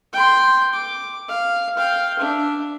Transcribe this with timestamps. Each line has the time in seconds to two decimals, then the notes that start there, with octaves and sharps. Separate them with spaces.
0.13 G5 C6
0.74 D6
1.29 F5
1.77 F5 G5
2.19 D4 E5